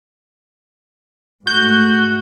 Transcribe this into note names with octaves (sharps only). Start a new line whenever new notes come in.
G#2 A3 F#4 G6